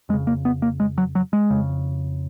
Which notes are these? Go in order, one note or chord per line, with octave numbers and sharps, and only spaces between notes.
F2 C#3 G#3
A#3
B3
A#3
G#3
F#3
F#3
G#3
F2 C#3